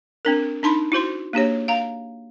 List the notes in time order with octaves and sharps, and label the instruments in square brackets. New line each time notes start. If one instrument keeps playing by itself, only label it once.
[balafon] C4 D4 A#4
D4 D#4 A5 B5 C6
E4 F#4 C5 C6
A#3 D4 G4 C#5
F5 A#5